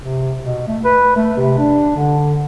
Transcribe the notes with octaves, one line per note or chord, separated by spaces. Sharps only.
C3
B2
A3
B4
A3
C3
D4
D3